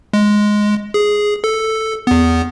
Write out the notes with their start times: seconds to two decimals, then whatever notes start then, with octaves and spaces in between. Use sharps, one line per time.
0.13 G#3
0.94 G#4
1.44 A4
2.07 E2 B3